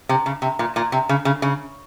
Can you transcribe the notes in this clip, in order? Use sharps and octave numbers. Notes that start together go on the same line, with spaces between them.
C3
C#3
C3
A#2
A#2
C3
C#3
C#3
C#3